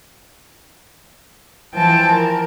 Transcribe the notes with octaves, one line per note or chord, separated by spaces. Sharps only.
E3 F3 G5 A5
A#4